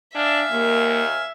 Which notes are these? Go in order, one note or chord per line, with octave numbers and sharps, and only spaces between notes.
D4 E5 F5 G#5
D#2 A#3